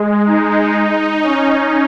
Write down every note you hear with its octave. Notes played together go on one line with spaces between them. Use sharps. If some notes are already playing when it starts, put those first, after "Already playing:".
Already playing: G#3
D#4
C#4